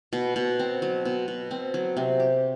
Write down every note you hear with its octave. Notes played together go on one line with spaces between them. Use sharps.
B2
B2
C4
F#3
B2
B2
C4
F#3
C3
G4